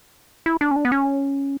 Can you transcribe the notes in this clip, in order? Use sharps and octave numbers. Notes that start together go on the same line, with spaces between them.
E4
D4
C#4
D4
B3
C#4